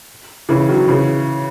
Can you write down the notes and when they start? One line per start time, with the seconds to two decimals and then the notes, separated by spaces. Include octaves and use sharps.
0.49 C#3 E3
0.68 D#3 F#3
0.88 C#3 E3